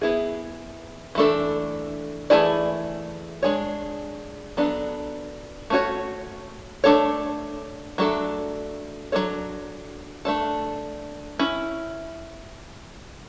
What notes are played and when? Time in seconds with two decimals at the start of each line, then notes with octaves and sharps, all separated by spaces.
0.01 B3 E4 G#4
1.15 E3 A3 D4 A4
2.30 E3 A3 E4 G#4 D5
3.43 G#3 D4 G#4 C#5
4.57 F#3 B3 D4 A4
5.70 A3 C#4 F#4 C#5
6.84 A3 D4 A4 C#5
7.98 F#3 A3 D4 A4
9.12 F#3 A3 D4 A4 C#5
10.25 A3 D4 A4
11.39 C#4 E4